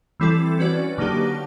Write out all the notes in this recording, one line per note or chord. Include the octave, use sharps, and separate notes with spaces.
E3 G3 C4 E4 A4
C#4 F#4 B4 D5
D3 F#3 A#3 D#4 G4